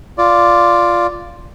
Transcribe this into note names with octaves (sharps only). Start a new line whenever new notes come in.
F4 D5